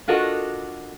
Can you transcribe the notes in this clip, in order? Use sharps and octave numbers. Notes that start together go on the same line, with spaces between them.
D4 F4 F#4 A4 A#4 D#5